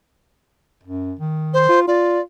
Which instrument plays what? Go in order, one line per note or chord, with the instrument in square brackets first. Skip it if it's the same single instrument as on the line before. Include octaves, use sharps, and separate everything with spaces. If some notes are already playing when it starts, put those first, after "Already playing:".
[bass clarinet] F#2
D#3
[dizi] C5
[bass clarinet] F4
[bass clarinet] F4 [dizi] D5